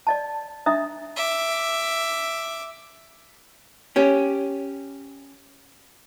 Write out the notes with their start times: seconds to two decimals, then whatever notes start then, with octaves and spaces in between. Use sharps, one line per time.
0.07 D5 D#5 A5
0.66 D4 D#5 E5 A#5 D#6
1.16 E5 D6
3.96 C#4 G4